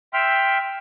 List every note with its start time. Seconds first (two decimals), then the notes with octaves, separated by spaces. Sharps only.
0.14 E5 G5 C6 E6 F6